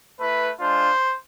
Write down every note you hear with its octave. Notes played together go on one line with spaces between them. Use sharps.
A3 E4 B4
G#3 D4 F4 C5